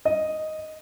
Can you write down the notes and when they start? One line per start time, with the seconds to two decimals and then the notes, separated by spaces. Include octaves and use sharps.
0.05 D#5